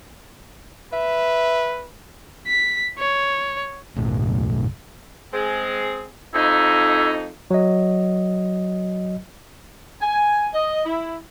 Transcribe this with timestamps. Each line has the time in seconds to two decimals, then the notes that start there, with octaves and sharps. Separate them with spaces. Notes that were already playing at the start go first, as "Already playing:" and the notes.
0.93 B4 E5
2.48 B6
2.99 C#5
3.96 F#1 B1 A2
5.33 G#3 C4 G#4
6.34 F2 D#4 E4
7.51 F#3 D#5
10.01 G#5
10.53 D#5
10.85 E4